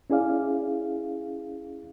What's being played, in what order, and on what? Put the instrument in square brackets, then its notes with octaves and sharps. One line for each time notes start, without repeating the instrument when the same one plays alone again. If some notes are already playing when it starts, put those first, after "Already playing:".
[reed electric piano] C#4 E4 G#4 D5 F5